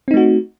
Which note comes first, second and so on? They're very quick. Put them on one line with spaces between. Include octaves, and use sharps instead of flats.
C4 D#4 A3 F#4